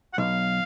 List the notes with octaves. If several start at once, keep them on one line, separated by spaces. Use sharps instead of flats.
F#5
B1 F5